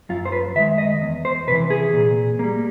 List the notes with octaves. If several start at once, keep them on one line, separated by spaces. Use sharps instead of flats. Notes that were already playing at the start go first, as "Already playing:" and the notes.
F#2 F4
C5
B4
D#3 G#3 E5
D#5
E2
C5
C3 E3 B4
G#4
A#2
G3 A#3